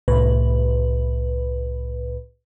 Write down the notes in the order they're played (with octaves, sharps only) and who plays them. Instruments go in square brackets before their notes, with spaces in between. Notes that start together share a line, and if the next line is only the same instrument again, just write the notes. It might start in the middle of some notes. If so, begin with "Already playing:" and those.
[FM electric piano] C2 A2 B4